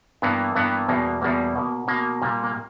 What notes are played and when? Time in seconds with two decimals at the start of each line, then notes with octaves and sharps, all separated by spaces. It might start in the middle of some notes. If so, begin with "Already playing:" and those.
0.22 G2 E3 A#3 B3
0.56 G2 E3 A#3 B3
0.88 E2 B2 G3 A#3
1.21 E2 B2 G3 A#3
1.56 B2 A#3
1.88 B2 A#3
2.22 A#2 G3 A#3
2.43 A#3